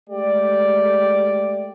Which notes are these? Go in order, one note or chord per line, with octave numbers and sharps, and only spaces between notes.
G#3 A3 G4 D5